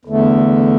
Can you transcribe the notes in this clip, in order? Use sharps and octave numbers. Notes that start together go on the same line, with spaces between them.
E2 D3 A3